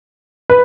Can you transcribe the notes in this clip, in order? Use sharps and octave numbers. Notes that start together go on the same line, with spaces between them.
B4